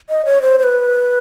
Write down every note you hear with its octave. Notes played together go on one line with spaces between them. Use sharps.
D#5
C#5
C5
C5
B4